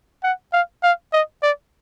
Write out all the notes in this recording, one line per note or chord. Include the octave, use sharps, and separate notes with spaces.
F#5
F5
F5
D#5
D5